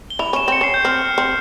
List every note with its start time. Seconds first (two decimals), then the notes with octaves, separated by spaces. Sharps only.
0.10 G7
0.19 E4 F7
0.33 C#4 E7
0.48 C4 C#7
0.61 C#4 C7
0.74 G6
0.85 C4 F6
1.18 C4